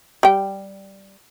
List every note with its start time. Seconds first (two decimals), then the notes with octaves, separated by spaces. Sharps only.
0.23 G3 G5